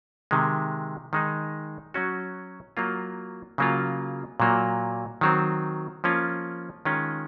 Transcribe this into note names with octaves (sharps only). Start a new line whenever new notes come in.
C3 D#3 G#3
D#3 G#3 D#4
F#3 C#4 F#4
F#3 A#3 F4
C#3 F#3 A#3 F4
A#2 F#3 A#3
D#3 F#3 C4
F3 A#3 C#4 F4
D#3 G#3 C#4 F4